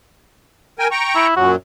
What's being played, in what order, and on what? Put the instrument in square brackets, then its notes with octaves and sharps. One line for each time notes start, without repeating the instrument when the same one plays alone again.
[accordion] A#4 G5 G#5
G5 A#5 C#6
[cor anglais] E4
[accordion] F#2 A#2 F#3 [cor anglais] F#4